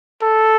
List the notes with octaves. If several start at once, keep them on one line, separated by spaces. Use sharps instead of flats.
A4